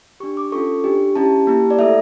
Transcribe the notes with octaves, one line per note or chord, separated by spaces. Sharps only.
D4 G4 C#6
D6
C#4 F4 A4 C#6
D4 G4
C#4 E4 G4 A5
A#3 E4 G4
D5
A3 E4 A4 E5